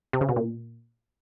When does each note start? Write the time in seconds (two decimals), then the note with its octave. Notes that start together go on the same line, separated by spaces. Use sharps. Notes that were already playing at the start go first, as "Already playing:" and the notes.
0.13 C3
0.21 C#3
0.29 B2
0.36 A#2